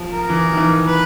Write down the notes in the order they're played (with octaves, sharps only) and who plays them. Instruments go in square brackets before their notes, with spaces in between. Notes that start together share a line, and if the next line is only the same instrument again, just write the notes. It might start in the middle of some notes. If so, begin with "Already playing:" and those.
Already playing: [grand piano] F3
[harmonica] A#4
[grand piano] E3
D#3
E3
[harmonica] B4